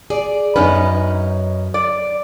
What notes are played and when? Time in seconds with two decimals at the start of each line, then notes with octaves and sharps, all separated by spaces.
0.10 G#4 D5
0.56 F#2 B3 C#4 D#4 B4
1.74 D5